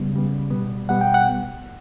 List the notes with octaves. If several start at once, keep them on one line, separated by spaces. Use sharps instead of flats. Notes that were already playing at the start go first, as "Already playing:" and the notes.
Already playing: C#3 G3 B3
C#3 G3 B3
B2 G3 B3
B2 G3 B3 F#5
G5
F#5